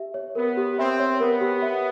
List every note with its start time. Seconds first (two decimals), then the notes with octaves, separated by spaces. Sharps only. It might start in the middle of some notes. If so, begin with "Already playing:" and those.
Already playing: G4 E5
0.14 C#5
0.35 B3 A#4
0.57 G4
0.78 C4 E5
0.99 C#5
1.20 B3 A#4
1.41 G4
1.62 E5